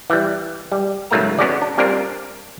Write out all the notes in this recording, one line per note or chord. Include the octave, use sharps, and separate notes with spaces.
E3 G3
G3
C#2 G#2 F#3 A3 A#3 A#5
B3 C#4 F#4 G#4 D5
D4
G3 C4 D4 F4 A#4